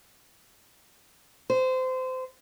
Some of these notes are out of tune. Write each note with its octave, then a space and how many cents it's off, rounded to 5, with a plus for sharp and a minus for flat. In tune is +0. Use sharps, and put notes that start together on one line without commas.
C5 -25